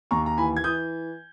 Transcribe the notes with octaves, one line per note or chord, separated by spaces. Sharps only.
D#2 A#5 C#6
A#5
E3 G#5 B5
G#6
E3 D#6 G6